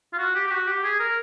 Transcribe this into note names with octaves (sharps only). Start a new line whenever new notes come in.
F4
F#4
G4
G4
F#4
G4
G#4
A#4